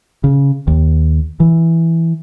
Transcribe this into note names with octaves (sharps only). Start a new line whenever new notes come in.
C#3
D#2
E3